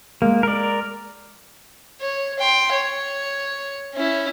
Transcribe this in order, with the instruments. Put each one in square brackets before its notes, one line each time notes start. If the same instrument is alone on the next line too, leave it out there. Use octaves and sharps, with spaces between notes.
[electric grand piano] G#3 [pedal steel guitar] A#3
[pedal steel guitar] A#4 D5
[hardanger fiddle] C#5
G5 C6
C#5
C#4 E4